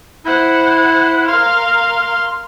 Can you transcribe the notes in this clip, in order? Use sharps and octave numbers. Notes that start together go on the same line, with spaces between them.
E4 C5 F#5
A#4 F5 C6 F6